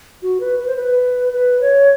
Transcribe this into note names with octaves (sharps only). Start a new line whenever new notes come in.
F#4
B4
B4
C5
B4
B4
C#5